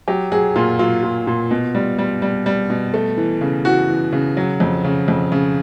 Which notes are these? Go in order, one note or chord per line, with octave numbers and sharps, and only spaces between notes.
F#3 G4
F#3 G#4
A#2 F4
F#3 F4
A#2
A#2
B2
G3
G3
G3
G3
B2
A3
E3
C#3
E3 F#4
E3
C#3
F#3
F2
C#3
F2
C#3